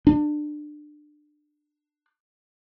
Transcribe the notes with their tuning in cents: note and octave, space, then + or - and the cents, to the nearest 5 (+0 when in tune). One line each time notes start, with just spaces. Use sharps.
D4 +25